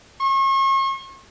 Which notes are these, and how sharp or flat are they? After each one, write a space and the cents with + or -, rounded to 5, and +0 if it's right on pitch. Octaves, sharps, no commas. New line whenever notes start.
C#6 -40